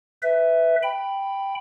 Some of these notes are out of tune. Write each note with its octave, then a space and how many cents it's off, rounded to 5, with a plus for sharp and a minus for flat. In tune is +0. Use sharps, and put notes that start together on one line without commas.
B4 +15 E5 -5
G5 +0 B5 +0